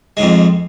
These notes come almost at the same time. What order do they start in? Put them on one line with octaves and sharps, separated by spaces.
G#3 G#2 F2